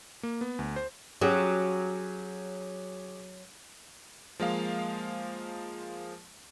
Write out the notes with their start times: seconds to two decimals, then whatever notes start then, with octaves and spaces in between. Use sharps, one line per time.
0.23 A#3
0.41 B3
0.59 D2
0.76 C5
1.21 F#3 C#4 G4 G#4
4.40 F3 G#3 A#3 F5